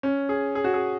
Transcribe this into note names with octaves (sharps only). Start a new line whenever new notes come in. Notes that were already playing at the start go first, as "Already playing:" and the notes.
C#4
G#4
G#4
F#4
G#4